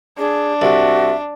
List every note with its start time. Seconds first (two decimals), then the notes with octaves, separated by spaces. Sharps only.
0.18 D4 G#4
0.62 C2 F#4 E5